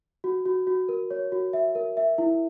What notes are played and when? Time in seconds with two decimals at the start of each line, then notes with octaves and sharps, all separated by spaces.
0.24 F#4
0.46 F#4
0.67 F#4
0.89 A#4
1.11 C#5
1.32 F#4
1.53 E5
1.75 A#4
1.97 E5
2.18 E4